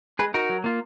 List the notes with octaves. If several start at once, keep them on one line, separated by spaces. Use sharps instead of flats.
G#3 G#4 B4
D#4 F#4 A#4
F#3
A#3 F4